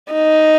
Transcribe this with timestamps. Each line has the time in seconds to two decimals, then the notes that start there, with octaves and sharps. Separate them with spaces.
0.12 D#4